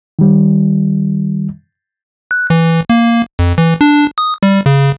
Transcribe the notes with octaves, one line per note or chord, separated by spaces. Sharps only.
D#3 G3
F#6
E3
A#3
F2
E3
D4
D#6
G3
C#3